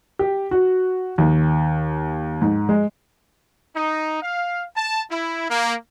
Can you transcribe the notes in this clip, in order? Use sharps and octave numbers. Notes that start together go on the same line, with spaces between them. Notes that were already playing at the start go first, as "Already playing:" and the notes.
G4
F#4
D#2
G#2
G#3
D#4
F5
A5
E4
A#3